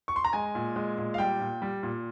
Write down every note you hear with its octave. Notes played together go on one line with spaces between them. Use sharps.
C#6
C6
A#5
G#3 G#5
A#2
G#3
A#2
F5
G3 G5
A#2
G3
A#2